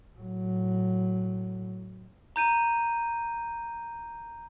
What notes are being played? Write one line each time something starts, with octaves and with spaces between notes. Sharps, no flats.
A2 F#3
A#5 G6 D#7